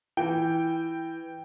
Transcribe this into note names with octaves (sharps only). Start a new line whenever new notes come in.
E3 G5